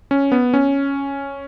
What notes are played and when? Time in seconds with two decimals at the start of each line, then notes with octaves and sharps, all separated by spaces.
0.11 C#4
0.32 B3
0.54 C#4